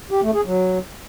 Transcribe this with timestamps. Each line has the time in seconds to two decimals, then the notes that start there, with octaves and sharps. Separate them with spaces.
0.11 G4
0.23 A3
0.34 G#4
0.46 F#3